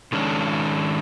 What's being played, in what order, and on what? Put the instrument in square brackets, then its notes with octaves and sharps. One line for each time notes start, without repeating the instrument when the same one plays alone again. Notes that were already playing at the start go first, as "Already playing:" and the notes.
[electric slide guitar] D#3 G#3 C#4 D4